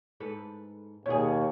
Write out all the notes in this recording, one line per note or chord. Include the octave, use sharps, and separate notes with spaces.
G#2 A4 B4
D#2 B2 G#4 C#5